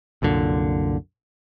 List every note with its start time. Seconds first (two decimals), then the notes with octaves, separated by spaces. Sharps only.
0.22 C2 F#2 A#2 D3